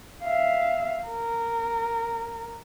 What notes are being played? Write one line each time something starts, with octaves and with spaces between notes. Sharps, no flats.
E5 F5
A#4